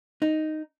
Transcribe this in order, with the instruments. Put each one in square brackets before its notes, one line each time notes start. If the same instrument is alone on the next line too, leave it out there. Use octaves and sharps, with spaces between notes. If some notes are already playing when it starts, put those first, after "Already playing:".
[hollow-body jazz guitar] D#4